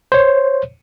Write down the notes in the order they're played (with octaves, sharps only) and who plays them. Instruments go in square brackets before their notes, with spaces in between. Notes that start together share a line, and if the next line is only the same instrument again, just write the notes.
[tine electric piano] C5 C#5